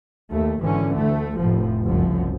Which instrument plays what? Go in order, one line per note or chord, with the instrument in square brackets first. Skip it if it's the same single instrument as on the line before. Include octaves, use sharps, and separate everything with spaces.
[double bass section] D#2 A3
G#1 D3 E3 C#4
D2 A3
F1 A2 F3
F#1 C2 F#2 F3